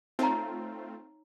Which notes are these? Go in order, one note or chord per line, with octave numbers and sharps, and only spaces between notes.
A3 C4 D#4 F4 C#5 A#5